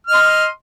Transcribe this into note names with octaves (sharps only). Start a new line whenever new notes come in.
D#5 C6 F6